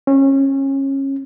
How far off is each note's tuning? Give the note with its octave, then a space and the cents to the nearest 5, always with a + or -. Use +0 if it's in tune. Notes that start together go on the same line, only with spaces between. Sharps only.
C#4 -25